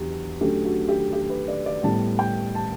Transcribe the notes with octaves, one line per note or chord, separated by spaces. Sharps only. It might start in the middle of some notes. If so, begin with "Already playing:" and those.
Already playing: E2 D3 F#3 G4
D3 F#3 A3 C#4 G4
F#4
G4
G4
B4
D5
D5
A2 G3 B3 A5
G5
A5